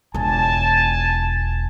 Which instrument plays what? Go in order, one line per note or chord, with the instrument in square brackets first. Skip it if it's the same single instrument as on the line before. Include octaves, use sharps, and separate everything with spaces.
[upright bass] E1 F4 [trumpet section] G#5 A5